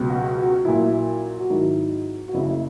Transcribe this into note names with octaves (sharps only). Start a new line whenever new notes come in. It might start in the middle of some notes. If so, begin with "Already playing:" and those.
Already playing: C#2 B2 F#3
F#4
F#4
A#1 A#2 F#3 E4
F#4
G#1 G#2 D#3 F#3 E4
F#4
F#1 F#2 C#3 E4